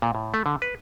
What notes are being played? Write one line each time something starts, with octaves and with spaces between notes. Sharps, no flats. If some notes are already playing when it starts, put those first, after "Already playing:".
A#2
A2
A3
D3
B4